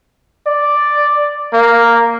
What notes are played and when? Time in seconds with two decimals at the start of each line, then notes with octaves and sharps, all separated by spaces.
0.47 D5
1.54 A#3